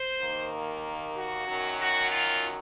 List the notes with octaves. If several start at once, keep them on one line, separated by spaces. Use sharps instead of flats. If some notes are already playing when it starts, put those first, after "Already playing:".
Already playing: C5
D#2 D#3 A#3
F#4
F#2 D#3 F#3
F#4
F4